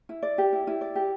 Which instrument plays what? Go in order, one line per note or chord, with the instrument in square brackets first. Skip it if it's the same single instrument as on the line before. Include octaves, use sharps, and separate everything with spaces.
[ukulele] E4
D5
G4
E4
E4
D5
G4